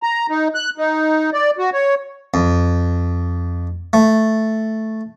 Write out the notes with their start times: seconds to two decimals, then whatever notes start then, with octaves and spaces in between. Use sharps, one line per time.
0.03 A#5
0.30 D#4
0.55 F#6
0.78 D#4
1.33 D5
1.58 F#4
1.73 C#5
2.34 F2
3.93 A3